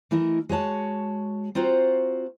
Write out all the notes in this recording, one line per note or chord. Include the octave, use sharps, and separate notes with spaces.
E3 A3 E4 A#4 D#5
G#3 F#4 C#5 A5
C4 F4 F#4 C5 A#5